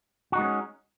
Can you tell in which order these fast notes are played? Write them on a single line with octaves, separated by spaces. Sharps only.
F#4 D#4 G#3 B3 C#4